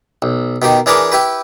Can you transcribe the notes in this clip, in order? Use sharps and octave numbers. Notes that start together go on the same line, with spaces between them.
B1
B2 D#3 G4
E3 D4 G#4 A#4 B4 D6
E4 G4 B4